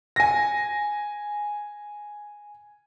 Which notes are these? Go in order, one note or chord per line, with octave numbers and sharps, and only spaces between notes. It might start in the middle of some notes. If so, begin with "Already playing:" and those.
G#5 A#6